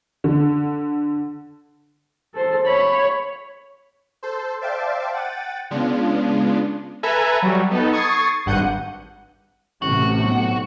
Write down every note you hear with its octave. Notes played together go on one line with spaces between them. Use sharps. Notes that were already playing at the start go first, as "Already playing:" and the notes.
D3
A4 C5
C#5 B5
A4 C5
C5 D5 E5 F5 G5 A5
F#5 G5 A6 D#7
C#3 G#3 B3 D4 F4
A4 B4 E5 G#5 A#5
F#3 G3
B3 D#4 A4
C#6 D#6 G#6 A6 C7
G#1 G2 F#5 G6 C#7 D#7
A1 A2 C3 A3 F#4
B1